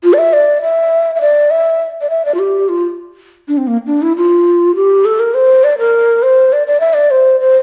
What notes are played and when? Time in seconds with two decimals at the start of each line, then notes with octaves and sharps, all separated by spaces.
0.04 F4
0.13 D5
0.18 E5
0.33 D5
0.62 E5
1.15 E5
1.21 D5
1.51 E5
2.01 D5
2.10 E5
2.25 D5
2.34 F4
2.39 G4
2.69 F4
3.48 D4
3.58 C4
3.67 A#3
3.87 D4
4.02 E4
4.17 F4
4.75 G4
5.05 A4
5.20 A#4
5.34 C5
5.64 D5
5.79 A#4
6.23 C5
6.53 D5
6.67 D5
6.80 E5
6.94 D5
7.11 C5
7.40 C5